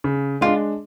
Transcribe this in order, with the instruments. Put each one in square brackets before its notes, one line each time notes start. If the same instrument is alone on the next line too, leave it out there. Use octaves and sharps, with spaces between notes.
[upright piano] C#3
[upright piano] G#3 D4 [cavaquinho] F4